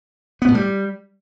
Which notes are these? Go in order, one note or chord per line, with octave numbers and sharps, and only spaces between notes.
B3
A2
G3